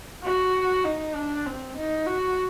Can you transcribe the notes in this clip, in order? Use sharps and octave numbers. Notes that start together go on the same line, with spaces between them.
F#4
D#4
D4
C4
D#4
F#4